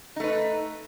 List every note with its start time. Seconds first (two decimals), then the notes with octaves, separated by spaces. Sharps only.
0.16 D#4
0.20 A3
0.24 B4